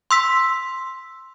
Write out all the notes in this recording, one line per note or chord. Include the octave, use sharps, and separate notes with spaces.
C6 E6 B6